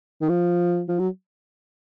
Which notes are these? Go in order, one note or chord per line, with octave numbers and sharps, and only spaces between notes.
D#3
F3
F3
F#3